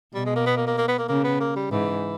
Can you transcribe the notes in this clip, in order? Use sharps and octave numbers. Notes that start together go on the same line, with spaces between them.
B2 G3
G#3
A#3
B3
A#3
A#3
A#3
B3
A#3
C#3 A#3
B3
A#3
G3
G#2 E3